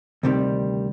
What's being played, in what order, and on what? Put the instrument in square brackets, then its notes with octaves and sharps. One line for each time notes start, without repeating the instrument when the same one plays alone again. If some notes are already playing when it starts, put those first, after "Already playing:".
[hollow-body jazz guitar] D2 C3 D#3 G3